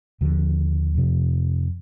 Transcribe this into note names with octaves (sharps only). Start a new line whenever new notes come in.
D#2 D3 F3
F2 C3 F3